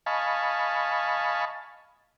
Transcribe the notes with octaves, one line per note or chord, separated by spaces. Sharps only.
D#5 F5 G#5 A5 B5 C#6